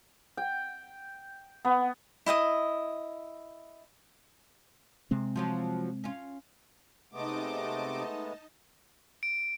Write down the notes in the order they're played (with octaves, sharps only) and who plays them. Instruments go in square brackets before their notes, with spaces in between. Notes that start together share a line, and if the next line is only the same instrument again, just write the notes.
[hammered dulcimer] G5
B3
[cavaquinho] E4 D#5 G5 D#6
[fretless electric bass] C3 G#3 C4
[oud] F3 F#3 F4
C#4 F4
[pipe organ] C3 D6 [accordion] G#3 A3 B3 [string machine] D#4 D#5 A5
[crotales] D7